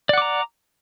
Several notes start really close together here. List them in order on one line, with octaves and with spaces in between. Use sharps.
D5 F#5 D6 A#5